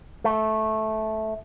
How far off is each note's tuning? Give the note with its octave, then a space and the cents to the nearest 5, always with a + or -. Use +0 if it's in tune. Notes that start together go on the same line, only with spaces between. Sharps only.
A3 -10